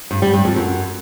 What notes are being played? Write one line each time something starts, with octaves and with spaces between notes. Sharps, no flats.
G2
G3
G2
F2
F#2